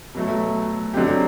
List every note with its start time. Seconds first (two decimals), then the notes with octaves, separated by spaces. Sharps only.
0.15 B2 F#3 A3
0.94 D3 F#3 C4 G4